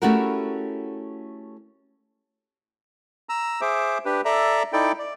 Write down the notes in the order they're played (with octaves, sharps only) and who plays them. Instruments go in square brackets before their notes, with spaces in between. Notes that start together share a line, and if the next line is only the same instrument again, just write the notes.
[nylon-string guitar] A3 C#4 E4 F#4 G4 A#4
[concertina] A#5 E6
G#4 C5 E5 D6
D4 G4 B4
A4 D5 E5 A#5
D#4 E4 A4 D5 G5
D5